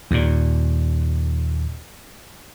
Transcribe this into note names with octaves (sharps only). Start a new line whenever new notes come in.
D#2 A#2